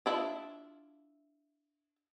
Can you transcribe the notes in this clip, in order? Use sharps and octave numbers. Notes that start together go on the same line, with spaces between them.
D4 E4 F4